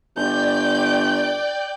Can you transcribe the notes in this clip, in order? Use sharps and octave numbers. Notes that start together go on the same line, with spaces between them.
G1 D5 G5 G6